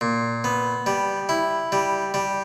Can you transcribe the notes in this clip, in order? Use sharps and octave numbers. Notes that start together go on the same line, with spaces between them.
A#2
B3
G3
E4
G3
G3